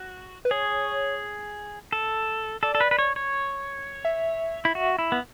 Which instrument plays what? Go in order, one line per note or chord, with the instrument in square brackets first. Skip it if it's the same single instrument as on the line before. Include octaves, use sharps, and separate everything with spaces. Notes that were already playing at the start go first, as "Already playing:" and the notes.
Already playing: [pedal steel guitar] F#4
[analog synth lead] B4
[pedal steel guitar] G#4 [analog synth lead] C#5
[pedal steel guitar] A4
[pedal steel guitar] A4 [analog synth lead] D5
[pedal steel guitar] A4
B4
B4
C#5
C#5
[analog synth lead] E5
[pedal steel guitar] E4
F#4
E4
B3